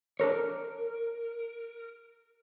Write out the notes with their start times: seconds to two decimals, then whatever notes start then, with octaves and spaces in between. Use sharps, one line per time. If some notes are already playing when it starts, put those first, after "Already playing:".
0.20 D4 A4 A#4 C#5
0.32 A#4